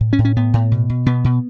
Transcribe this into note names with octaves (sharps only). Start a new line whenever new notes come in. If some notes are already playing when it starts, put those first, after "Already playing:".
A2
C#4
A2
C#4
A2 B3
A2
B2
B2
B2 B3
B2